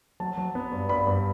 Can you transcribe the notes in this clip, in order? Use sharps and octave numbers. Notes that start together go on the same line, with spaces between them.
F#3 A5
F#3
B3
G2
G2 B5
G2